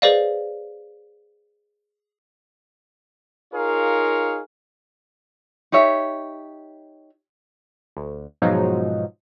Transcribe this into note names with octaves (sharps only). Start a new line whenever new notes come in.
G#4 B4 C5 D5 D#5 F5
D#4 F4 G#4 A#4 C#5 F5
D#4 G4 C#5 E5
D2
G#2 B2 F3 F#3 D#4